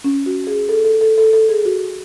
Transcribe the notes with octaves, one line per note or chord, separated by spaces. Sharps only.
C#4
F#4
G#4
A4
A4
A4
A4
A4
G#4
F#4